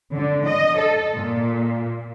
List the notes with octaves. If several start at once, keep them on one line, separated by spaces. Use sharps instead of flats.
D3
D#5
A4
A#2